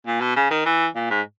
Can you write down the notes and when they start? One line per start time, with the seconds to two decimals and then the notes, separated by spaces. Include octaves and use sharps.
0.07 A#2
0.21 B2
0.36 C#3
0.51 D#3
0.66 E3
0.96 A#2
1.10 G#2